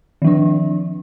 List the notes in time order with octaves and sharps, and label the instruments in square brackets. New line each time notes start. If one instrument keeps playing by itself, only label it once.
[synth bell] D#3
F3
D4